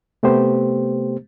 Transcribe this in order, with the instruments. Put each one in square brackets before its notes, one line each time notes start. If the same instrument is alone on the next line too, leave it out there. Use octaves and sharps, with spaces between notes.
[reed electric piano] C3 A3 B3 G4 C5